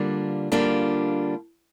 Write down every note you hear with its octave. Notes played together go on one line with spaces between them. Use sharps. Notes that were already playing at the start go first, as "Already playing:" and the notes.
Already playing: D3 G3 A#3 D4 F4
D3 G3 A#3 D4 F4